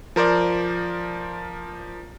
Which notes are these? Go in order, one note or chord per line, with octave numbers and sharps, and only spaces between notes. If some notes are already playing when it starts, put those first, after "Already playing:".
F3 A#4 C5 D5